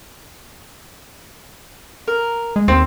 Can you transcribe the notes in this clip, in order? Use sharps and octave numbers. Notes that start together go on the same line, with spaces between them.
A#4
G#3
D#2 C4